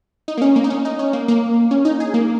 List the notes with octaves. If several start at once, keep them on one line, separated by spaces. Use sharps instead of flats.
D#4
A#3
C#4
A#3
D#4
C#4
D#4
C#4
A#3
A#3
C#4
D#4
G#4
A#3